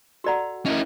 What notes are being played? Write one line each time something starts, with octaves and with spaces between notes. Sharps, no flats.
F#4 A4 D5 F#5 A#5
C#4 E4 A#4 D#5